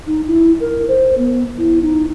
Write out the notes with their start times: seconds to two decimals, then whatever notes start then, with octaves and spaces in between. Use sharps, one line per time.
0.07 D#4
0.28 E4
0.60 A#4
0.88 C5
1.18 B3
1.58 E4
1.82 D#4